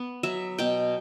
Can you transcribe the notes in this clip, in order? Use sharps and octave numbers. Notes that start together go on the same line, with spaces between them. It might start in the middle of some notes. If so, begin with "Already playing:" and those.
Already playing: B3
F#3 E5
B2 G5